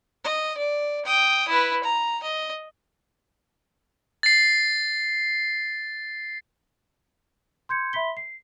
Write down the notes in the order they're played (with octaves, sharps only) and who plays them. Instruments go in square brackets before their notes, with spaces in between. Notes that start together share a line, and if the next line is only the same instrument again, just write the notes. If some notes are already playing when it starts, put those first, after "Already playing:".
[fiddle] D#5
D5
G5 D#6
E4 B4
A#5
D#5
[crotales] A6 C7
[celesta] C6 G6 G#6 C#7
E5 B5 C6 B6 G7
C7